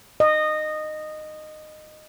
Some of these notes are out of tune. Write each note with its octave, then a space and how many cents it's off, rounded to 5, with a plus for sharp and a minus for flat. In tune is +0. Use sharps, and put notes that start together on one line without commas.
D#5 -15